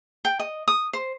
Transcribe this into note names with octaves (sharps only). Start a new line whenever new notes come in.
G5
D#5
D#6
C5